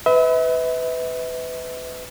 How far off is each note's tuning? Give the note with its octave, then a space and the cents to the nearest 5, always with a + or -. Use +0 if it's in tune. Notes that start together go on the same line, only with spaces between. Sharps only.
B4 +25 E5 -40